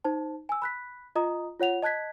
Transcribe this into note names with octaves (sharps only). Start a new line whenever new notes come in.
D#4 C5 A5
G#5 E6
B5 F#6 B6
F4 D#5 A#5 D#6
F4 C#5 F#5 F7
D#5 A5 F#6 G#6 B6